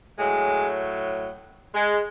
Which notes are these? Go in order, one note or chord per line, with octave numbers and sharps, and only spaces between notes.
A2 F#3 G#3
G#3